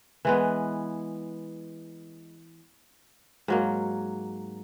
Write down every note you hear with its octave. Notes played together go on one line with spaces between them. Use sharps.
E3 G#3 B3
G#2 F#3 A#3